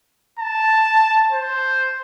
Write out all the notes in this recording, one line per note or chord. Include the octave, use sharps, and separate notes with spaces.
A5
C5